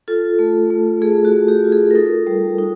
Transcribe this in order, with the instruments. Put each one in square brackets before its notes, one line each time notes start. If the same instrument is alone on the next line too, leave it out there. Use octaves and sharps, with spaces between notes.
[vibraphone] F4 A4
A3
A3
A3 G#4
F#4
A3
G4
F4
G#4
A#4
D#4 A4
G3
D#4